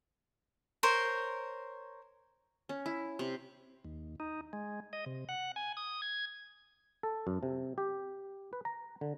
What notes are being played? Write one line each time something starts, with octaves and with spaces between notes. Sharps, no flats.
A#4 C5 C#5
C#4
E4
C3
D#2
D#4
G#3
D#5
C3
F#5
G#5
D#6
G#6
A4
F#2
C3
G4
B4
A#5
D3